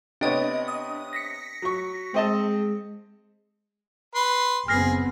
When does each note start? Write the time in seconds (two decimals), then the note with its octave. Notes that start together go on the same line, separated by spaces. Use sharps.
0.21 C3 B3 D4 C#5 D#5
0.68 D#6
1.13 A#6 B6 C#7
1.62 F#3 C#6
2.14 G#3 C4 D#5 A5
4.15 B4 C6
4.68 F#1 B3 C4 G#4 F6 A#6 C7